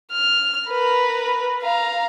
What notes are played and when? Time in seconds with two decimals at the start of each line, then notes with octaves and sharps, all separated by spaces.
0.12 F6
0.69 A#4 B4
1.62 F5 A#5